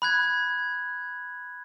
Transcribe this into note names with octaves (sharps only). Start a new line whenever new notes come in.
B5 F#6 G#6